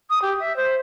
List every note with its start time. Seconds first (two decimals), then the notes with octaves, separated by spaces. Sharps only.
0.10 D#6
0.22 G4
0.39 E5
0.56 C5